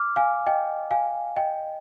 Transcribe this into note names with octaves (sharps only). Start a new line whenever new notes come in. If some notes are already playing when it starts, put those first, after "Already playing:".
Already playing: D6 F6
F5 G#5
D#5 G5
F5 G#5
D#5 G5